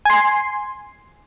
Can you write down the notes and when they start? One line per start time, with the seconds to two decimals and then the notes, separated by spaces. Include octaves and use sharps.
0.05 G#5 C6